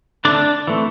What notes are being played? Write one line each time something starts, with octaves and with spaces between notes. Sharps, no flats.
D3 A3 C4 D4 D5
E3 A3 C4